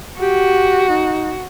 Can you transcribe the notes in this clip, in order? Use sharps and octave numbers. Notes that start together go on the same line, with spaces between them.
F#4 G4
D#4